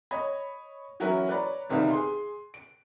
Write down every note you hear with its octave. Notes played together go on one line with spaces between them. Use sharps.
C#5 D#5 B5 G#6
E3 F#3 C#4 E4 A#4 B4
B4 C#5 D5 A#5 B5
G1 C3 D#3 G3 E5 F5
G#4 C6
D7